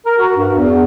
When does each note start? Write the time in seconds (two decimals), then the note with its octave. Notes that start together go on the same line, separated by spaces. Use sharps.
0.06 A#4
0.19 F#4
0.36 G2
0.55 E2